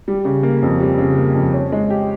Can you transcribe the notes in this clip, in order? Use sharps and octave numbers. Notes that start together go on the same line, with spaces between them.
G3
C#3
A#3
F2
G3
C#3
A#3
F2
C#4
G#3
G4